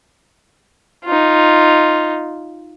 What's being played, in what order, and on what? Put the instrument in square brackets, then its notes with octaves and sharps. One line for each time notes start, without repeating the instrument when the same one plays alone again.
[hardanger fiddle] D#4 F4